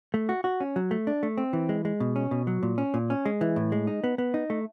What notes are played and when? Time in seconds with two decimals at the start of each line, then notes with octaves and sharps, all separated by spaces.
0.14 A3
0.29 F#4
0.44 F#4
0.60 C#4
0.76 F#3
0.91 A3
1.07 D4
1.23 A3
1.38 C4
1.53 E3
1.69 G#3
1.85 G#3
2.00 B2
2.16 C#4
2.31 B2
2.47 F#3
2.63 A#2
2.78 C#4
2.94 A#2
3.10 C#4
3.25 G#3
3.41 E3
3.56 A2
3.72 G#3
3.87 D#4
4.04 B3
4.18 B3
4.34 D#4
4.50 A3